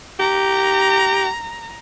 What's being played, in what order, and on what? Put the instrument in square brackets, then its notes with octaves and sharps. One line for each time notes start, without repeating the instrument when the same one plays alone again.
[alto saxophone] G4 [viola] A#5